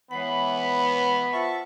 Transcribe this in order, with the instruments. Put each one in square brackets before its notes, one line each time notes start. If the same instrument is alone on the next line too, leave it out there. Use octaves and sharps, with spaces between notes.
[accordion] E3 [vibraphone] G#3 C#5 F#5 [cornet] B3 [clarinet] B5
[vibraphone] F4 C5 F#5 [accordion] E5 A5 C#6